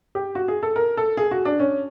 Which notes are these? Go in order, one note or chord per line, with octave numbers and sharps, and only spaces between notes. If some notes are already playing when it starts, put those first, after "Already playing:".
G4
F#4
G#4
A4
A#4
A4
G#4
F#4
D4
C#4